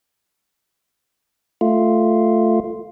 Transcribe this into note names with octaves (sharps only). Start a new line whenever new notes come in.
A3 F4